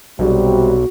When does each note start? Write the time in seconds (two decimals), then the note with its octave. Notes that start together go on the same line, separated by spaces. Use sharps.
0.19 B1 C3 G3 F#4